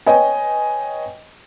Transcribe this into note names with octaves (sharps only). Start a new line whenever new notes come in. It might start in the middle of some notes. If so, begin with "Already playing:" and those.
B4 C#5 D#5 G5 G#5